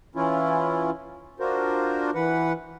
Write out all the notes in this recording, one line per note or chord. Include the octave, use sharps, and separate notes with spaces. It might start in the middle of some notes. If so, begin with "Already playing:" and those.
E3 C#4 E4 F4
D4 F4 F#4 A#4 C5
E3 B4 F#5